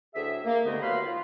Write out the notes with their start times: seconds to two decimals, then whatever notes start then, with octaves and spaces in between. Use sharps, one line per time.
0.15 D2 A2 G#4 E5
0.45 A#3
0.65 C2 G2 D3 A3 B3 D#5
0.81 D#2 F#3 B4 F5 B5 C6
1.05 F4